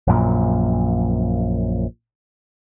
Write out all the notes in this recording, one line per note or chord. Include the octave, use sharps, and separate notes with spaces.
A#1 F#2 A#2